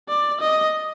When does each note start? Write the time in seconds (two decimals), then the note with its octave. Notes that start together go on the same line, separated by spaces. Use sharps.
0.09 D5
0.41 D#5